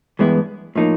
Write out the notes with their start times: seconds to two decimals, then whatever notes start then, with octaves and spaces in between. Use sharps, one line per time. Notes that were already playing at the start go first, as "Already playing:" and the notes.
0.19 G2 E3 G#3 B3 E4
0.76 A2 F3 A#3 D#4